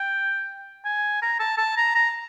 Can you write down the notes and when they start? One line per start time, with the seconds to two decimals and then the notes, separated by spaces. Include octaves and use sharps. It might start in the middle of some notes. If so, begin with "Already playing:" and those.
Already playing: G5
0.85 G#5
1.22 A#5
1.39 A5
1.57 A5
1.77 A#5
1.95 A#5